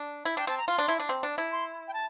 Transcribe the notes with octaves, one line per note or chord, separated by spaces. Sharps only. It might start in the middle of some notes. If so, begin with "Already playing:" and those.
Already playing: D4
E4
D4 G5
C4 A5
A#5
F4 C6
D4
E4
D4
C4
D4
E4
C6
G5
A5